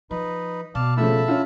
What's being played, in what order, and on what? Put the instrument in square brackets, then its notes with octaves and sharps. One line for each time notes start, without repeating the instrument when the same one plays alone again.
[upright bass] F3 [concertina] D#4 B4
[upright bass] B2 [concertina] D5 F5 A5
[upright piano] C#3 F3 A3 [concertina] E5 A5 B5
[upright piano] C#4 F4